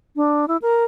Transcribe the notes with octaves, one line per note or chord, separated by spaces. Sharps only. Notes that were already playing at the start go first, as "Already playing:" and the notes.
D4
E4
A#4